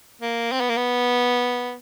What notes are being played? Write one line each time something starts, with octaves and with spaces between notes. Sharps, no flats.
A#3
C4
B3
A#3
B3